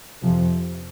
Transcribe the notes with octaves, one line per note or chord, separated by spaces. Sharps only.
F2 C3 F3